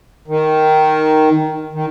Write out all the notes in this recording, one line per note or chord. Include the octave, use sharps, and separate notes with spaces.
D#3
D#3